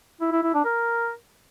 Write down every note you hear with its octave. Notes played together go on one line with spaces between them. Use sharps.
E4
E4
E4
D4
A#4